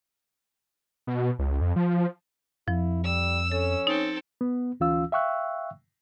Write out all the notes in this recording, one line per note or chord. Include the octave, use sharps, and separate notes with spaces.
B2
C#2
F2
F3
F2 F3 E4
G3 E6
C#4 A4
C4 D#4 A4
B3
D2 E3 C#4 F4 F5 E6
E5 F5 G5 C#6 E6 F#6